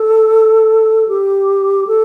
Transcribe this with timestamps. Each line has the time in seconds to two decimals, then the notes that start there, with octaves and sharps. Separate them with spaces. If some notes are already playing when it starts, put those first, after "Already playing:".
Already playing: A4
1.08 G4
1.87 A4